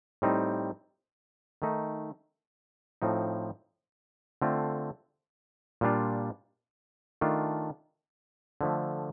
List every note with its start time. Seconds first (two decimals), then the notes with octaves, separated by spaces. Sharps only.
0.22 A2 G3 C4 D#4
1.62 D#3 A3 D#4
3.02 A2 F3 C4 D#4
4.42 D3 A3 C4 F4
5.81 A#2 G3 D4 F4
7.21 D#3 A3 D4 F4
8.61 D3 F3 A3